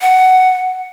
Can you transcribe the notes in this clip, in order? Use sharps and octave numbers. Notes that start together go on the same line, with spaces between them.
F#5